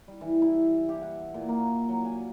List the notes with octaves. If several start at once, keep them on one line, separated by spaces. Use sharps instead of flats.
G3
E3
E4
G4
F#5
A#2
A#3
F#3
G#5